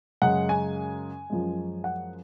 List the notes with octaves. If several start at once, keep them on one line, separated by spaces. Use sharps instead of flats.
F#2 C#3 G#3 F#5
G#5
F#2 F3 G#3
F#5